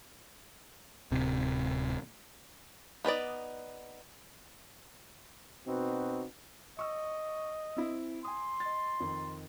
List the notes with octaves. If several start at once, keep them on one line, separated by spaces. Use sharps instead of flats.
D1 C3
B3 D#4 B4 D5
B2 C4 D#4 F#4 B4
D#5 C#6 E6
C4 E4
G#5 C6 D#6
D#5 A6
F2 D#3